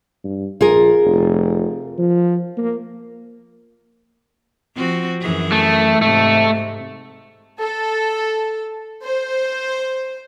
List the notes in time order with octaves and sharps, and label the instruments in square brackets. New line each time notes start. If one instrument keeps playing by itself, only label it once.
[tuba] G2
[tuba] A#1 [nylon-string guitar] F4 G#4 A#4
[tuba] F1
F3
A#3
[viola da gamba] F3 C4 F#4
F#2 E3 G#4
[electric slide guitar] A3
[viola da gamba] G#2 C3 [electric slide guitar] A3
[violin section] A4
C5